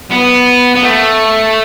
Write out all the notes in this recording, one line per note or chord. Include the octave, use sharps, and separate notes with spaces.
B3
B3
A3